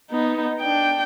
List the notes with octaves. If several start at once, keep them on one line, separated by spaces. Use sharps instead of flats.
B3 D#4
D4 G5